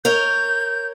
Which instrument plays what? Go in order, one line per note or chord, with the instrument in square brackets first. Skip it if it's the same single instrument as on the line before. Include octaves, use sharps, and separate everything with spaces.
[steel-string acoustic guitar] A#4 C#5 D#5 [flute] G6